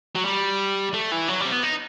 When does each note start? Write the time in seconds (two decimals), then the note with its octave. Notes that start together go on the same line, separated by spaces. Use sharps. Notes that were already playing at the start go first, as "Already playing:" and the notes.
0.15 F#3
0.25 G3
0.94 A3
1.12 E3
1.28 F#3
1.41 G3
1.46 C4
1.52 B3
1.63 D#4